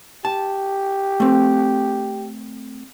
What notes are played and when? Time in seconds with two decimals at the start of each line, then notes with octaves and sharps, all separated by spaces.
0.25 G4 A5
1.20 A3 C4